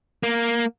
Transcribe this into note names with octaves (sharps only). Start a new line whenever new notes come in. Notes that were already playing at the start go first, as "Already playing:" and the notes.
A#3